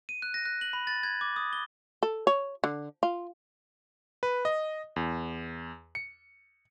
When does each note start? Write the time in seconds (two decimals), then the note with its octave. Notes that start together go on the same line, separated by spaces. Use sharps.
0.09 D#7
0.22 F#6
0.34 A#6
0.45 F#6
0.61 F#7
0.73 B5
0.87 A6
1.03 G#6
1.21 D6
1.36 D#6
1.53 G7
2.03 A4
2.27 C#5
2.64 D3
3.03 F4
4.23 B4
4.45 D#5
4.96 E2
5.95 C#7